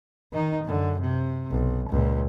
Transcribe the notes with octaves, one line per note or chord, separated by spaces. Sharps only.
D#3 D#4
F#2 D3
C3
B1
C#2 A#2